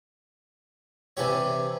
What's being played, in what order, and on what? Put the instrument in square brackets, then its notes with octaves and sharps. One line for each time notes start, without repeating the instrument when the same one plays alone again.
[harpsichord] C3 E3 D4 G4 C#5